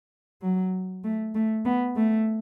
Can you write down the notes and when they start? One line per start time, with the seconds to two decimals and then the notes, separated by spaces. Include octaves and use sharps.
0.42 F#3
1.04 A3
1.35 A3
1.65 B3
1.96 A3